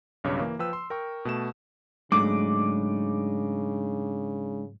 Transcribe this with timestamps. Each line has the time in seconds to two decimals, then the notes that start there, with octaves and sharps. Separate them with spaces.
0.24 B1 G2 C#3 C#5 D6
0.39 E3 A#3
0.59 F3 B4 G5 E6
0.73 C6
0.90 A#4 G5 C#6
1.25 B2 A3 E7
2.12 G#2 C#3 F#3 G#3 A3 D4 D#4 D6